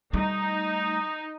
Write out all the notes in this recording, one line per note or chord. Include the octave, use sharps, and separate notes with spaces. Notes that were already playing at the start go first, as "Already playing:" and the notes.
G3 A3 D#4